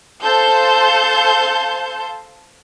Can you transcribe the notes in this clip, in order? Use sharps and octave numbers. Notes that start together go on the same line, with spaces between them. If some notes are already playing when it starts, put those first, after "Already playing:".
A4 C5 F5 A5 C6 G6